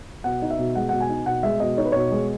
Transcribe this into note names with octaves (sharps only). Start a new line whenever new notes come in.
B2 F#5
D#4
E5
B2
G#3 F#5
B2 F#5
G#5
D#4
B2 F#5
G#3 E5
B2 D#5
D#4 C#5
B4
B2 C#5
G#3